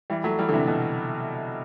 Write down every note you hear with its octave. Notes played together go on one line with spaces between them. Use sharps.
E3 G3
F#3 A3
E3 G3
D3
C3 E3
B2 D3